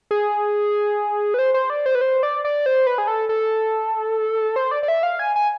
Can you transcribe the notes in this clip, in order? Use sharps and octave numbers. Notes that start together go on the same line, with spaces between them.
G#4
B4
C5
C5
D5
C5
B4
C5
D5
D5
C5
B4
G#4
A4
A4
C5
D5
D5
E5
F5
G#5
G#5